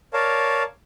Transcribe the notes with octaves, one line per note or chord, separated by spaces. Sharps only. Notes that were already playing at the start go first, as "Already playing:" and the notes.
A#4 C#5 D5 F5 A5